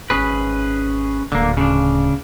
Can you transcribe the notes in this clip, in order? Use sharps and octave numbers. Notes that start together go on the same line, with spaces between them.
D#1 G#1 C#4 G#4 B4
D1 D3 A#3
C#3 D4